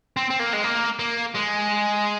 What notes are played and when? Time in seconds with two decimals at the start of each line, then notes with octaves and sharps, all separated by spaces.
0.17 C4
0.30 C4
0.40 A#3
0.53 G#3
0.64 A#3
0.99 A#3
1.35 G#3